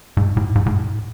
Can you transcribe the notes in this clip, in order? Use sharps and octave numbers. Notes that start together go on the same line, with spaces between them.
G#2
A2
G#2
A2